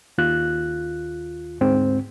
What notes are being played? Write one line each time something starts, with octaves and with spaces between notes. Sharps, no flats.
D#2 F4 F#6
D2 G#2 C4